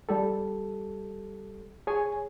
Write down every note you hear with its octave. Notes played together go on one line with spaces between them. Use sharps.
G3 G4 A4
G#4 C#5 G#5